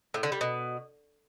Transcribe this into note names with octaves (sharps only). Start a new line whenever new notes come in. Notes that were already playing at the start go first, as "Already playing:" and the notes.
A2
D3
G3
B2